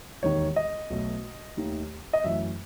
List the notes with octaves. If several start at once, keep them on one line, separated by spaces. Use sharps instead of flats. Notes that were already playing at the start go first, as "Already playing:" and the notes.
E1 D#2 D#3 C#5
D#5
B1 B2 A3
D#2 D#3 A3
D#5
F#2 E3 A3 E5